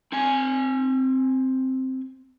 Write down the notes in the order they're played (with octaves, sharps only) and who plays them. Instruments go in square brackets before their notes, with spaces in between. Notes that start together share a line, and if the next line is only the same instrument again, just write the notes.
[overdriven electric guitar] C4 G#5